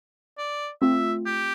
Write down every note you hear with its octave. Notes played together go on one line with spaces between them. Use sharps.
D5
A3 C4 F4 E5
G4